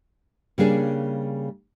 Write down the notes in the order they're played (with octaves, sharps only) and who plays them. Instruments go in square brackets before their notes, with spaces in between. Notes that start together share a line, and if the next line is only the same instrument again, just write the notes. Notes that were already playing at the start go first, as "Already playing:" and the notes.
[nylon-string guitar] C#3 G3 A#3 D4 G#4